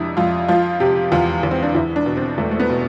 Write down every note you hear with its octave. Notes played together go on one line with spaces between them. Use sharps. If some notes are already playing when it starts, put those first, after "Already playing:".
Already playing: F2 C3 D4 E4
F2 F4
F3 F4
C3 G4
E2 F4
E2
C4
D4
E2 E4
D4
B2
C4
E2 A3
A3
B3
B2